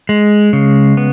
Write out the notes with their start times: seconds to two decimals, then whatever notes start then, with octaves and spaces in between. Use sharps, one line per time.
0.09 G#3
0.53 C#3
0.97 B3